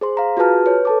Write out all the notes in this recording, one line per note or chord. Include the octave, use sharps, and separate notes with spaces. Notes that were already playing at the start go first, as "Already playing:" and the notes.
G#4 C5 C6
F5 A#5
F4 F#4 G#4 B4 A5 F6
B4 C#5
A4 A5 D6